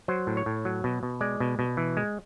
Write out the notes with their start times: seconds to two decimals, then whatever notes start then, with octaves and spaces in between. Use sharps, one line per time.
0.08 F#3 C5
0.27 A2
0.37 C#5
0.46 A2
0.65 F#3
0.84 B2
1.03 B2
1.21 G#3 D5
1.40 B2
1.59 B2
1.77 E3
1.97 G#3